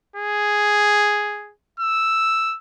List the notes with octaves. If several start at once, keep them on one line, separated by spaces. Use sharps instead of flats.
G#4
E6